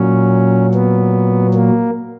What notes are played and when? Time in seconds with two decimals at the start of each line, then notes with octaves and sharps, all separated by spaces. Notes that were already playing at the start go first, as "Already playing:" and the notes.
Already playing: A#2 F#3 C#4
0.74 B3
1.54 A#3